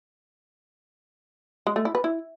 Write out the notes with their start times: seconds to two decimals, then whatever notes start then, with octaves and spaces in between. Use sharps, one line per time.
1.67 G#3
1.76 A3
1.85 E4
1.95 B4
2.04 E4